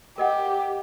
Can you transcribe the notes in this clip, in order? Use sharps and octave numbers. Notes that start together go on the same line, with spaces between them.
G4 A#4 D#5 F#5